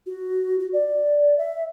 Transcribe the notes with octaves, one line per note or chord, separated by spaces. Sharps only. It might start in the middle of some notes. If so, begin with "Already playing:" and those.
F#4
F#4
D5
E5